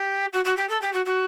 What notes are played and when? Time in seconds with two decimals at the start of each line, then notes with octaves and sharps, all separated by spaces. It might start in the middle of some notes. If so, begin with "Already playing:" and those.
Already playing: G4
0.33 F#4
0.44 F#4
0.56 G4
0.69 A4
0.81 G4
0.93 F#4
1.05 F#4